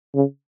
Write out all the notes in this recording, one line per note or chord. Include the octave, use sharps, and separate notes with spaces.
C#3